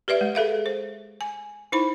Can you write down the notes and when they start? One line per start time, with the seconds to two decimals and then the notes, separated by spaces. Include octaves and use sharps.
0.08 G4 B4 D5 E5
0.21 G#3
0.35 G#4 A4 E5 F5
0.66 C5
1.21 G#5
1.72 D#4 E4 C5 B5